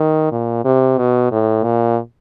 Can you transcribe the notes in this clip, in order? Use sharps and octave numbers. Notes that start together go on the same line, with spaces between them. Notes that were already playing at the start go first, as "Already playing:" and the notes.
Already playing: D#3
A#2
C3
B2
A2
A#2